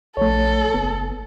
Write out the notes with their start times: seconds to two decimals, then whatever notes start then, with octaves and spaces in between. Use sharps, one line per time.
0.17 A#1 A3 A4 C#5
0.74 F#1 B3